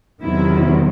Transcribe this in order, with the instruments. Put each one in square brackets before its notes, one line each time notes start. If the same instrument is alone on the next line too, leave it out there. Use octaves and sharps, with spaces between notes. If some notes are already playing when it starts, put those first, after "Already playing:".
[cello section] E2 C3 D#3 F#3 E4